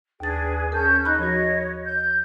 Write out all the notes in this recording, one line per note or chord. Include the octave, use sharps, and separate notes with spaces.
D#2 D4 G#4 B4 A6
C#4 G#4 A#4 A5 G6
D#4 B5 F#6
F3 F#4 C#5 D#5
G6